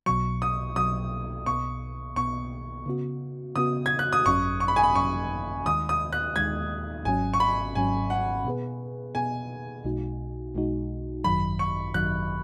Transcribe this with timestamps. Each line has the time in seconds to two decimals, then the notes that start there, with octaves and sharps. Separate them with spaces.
0.06 B1 B2 F#3 C#6
0.42 D#6
0.76 B1 B2 F#3 D#6
1.46 B1 B2 B3 C#6
2.16 B1 B2 B3 C#6
2.86 C#3 B3 F#4
3.56 C#3 B3 F#4 D#6
3.86 G#6
3.99 F#6
4.13 D#6
4.26 G#1 F#2 F#3 C#4 C#6
4.60 C#6
4.68 B5
4.76 G#5
4.83 B5
4.95 G#1 F#2 F#3 C#4 C#6
5.66 D#2 D#3 G#3 D#6
5.89 D#6
6.12 F#6
6.36 D#2 D#3 G#3 G#6
7.05 G#1 G#2 F#3 C#4 G#5
7.34 C#6
7.40 B5
7.75 G#1 G#2 F#3 C#4 G#5
8.10 F#5
8.45 B2 B3 G#4 B4
9.15 B2 B3 G#4 B4 G#5
9.84 B1 B2 G#3 D#4 F#4
10.55 B1 B2 G#3 D#4 F#4
11.24 G#1 F#2 D#3 F#3 B5
11.59 C#6
11.94 G#1 F#2 D#3 F#3 F#6